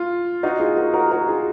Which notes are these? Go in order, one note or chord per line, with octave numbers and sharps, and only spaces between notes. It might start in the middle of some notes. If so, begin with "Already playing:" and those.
Already playing: F4
D#4 F#4
F4 G#4
F#4 A#4
F#4 A#4
F#4 A#4
F4 G#4